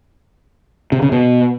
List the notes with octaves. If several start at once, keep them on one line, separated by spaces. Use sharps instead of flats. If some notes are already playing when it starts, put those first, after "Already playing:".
C3
C#3
B2